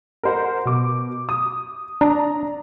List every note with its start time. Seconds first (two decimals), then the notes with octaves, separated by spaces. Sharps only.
0.23 A#4 C5 F#5
0.65 B2 D6
1.29 D#6
2.01 D4 A#5